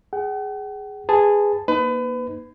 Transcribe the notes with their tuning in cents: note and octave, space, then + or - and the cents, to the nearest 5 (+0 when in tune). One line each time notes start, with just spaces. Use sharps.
G#4 +0 F#5 +45
G#4 -10 B4 +20 A5 +0
A#3 +30 D#4 +0 B4 +30